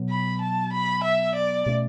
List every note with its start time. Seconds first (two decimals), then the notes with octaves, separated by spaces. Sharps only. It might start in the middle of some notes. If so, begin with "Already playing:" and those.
Already playing: B2 F#3 B3
0.10 B5
0.41 A5
0.73 B5
1.04 E5
1.35 D5
1.66 B2 A3 C#4